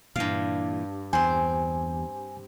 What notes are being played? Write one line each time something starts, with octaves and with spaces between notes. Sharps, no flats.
G2 A#2 E3 F5
E2 C4 C5 G#5